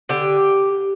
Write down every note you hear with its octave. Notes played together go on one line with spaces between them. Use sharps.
D3 G4